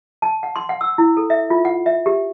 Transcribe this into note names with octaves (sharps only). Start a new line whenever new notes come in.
A5
F#5
C6
F#5
E6
E4
A4
E5
F4
F#5
E5
G4